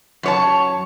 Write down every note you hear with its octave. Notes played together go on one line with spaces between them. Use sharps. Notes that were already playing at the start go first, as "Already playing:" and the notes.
F#2 C#5 A5